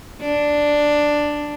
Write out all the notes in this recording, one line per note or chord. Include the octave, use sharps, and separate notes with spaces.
D4